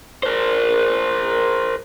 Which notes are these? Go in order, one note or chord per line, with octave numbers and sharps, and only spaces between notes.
A#4 C5